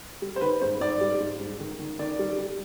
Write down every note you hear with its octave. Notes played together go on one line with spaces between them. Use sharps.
G3
C5
D#3 B4
G#2 C5
G#2 D5
G3
G#2
G#2
D#3
D#3
D#3 D5
G3
G3